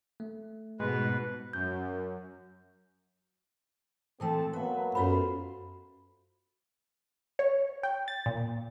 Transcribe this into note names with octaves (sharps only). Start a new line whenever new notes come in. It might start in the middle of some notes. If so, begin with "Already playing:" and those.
A3
G#2 B2 G#3 B4
F#2 G6
A#2 E3 A3 C4 A4 G5 A5
F#3 A#3 B3 B4 E5
F#2 F4 F#4 A4 C5 C#5 B5
C#5
G5
A6
A#2